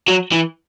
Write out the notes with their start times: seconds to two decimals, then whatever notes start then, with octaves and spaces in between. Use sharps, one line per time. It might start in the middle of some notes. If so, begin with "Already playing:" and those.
0.08 F#3
0.32 E3